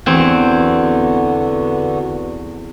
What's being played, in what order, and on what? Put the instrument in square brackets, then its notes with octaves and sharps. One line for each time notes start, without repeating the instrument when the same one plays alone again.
[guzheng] E2 C4 [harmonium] D3 B3 F#4